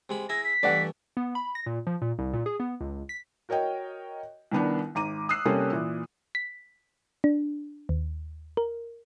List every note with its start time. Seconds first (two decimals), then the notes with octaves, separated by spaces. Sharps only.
0.09 C3 G#3 B5
0.29 E4 G#4 E5 A#6
0.44 B6
0.63 G2 E3 A3 D5 F#5
1.17 B3
1.35 B5
1.55 A#6
1.66 A#2
1.87 F3
2.02 A#2
2.19 C2
2.33 A#2
2.46 G#4
2.60 B3
2.81 C#2
3.09 B6
3.49 F#4 A#4 C#5 D#5 G5
4.52 C2 D#3 B3 D4
4.95 G#1 A#5 D6 D#7
5.29 D#6 E6 F#6 C7
5.45 C3 G3 A#3 C#4 G4 A4
5.72 A#2 E3
6.35 B6
7.24 D4
7.89 D#2
8.57 A#4